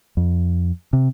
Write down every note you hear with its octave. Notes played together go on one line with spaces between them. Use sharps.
F2
C3